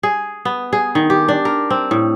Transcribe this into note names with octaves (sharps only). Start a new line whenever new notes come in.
G#4
B3
G#4
D#3
G4
D4
A#4
C4
A2